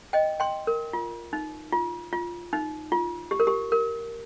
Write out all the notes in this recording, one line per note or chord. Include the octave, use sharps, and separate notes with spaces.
D#5 G5
G5 C6
A#4
F4
D#4
F4
F4
D#4
F4
G4
A#4
G4
A#4